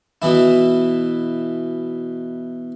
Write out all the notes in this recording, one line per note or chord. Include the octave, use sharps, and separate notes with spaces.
B2 E3 E4